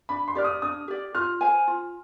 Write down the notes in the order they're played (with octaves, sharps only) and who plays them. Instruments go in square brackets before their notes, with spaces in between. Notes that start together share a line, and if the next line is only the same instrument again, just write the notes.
[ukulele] D4 [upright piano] B5
[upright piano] C6
[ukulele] G4 D5 [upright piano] F6
[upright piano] D#6
[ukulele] D4 [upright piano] D#6
[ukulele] G4 D5
[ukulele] F4 [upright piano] F6
[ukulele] C5 F5 G#5
F4